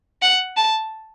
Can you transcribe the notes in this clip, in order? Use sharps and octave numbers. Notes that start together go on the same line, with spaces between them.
F#5
A5